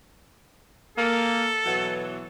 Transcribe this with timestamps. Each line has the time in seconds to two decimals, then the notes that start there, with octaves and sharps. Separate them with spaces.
0.98 A#3 A4
1.65 B2 E3 F#3